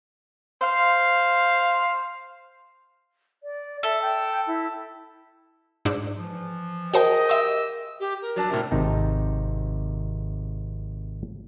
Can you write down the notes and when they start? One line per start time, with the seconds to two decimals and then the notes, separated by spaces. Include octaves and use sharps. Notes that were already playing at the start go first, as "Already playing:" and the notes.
0.62 C5 F5
3.43 D5
3.83 A4 E5
4.02 G5
4.47 E4
5.85 G#2 D4
6.16 E3 F3
6.93 F#4 G#4 A#4 C5 D#5 G5 G#5
7.29 G4 E5 C6 E6
8.00 G4
8.21 A#4
8.36 F#3 D4 A5
8.50 A2 C3 A#4
8.71 G#1 C3 D#4 G5 A5